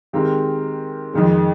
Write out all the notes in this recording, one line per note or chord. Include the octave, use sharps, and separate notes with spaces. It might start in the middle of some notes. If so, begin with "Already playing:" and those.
D#3 G#3 C4 G4 A#4
F2 D#3 G#3